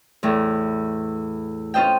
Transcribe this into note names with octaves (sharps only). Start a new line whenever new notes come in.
E2 A2
C#4 F4 C5 D#5 G5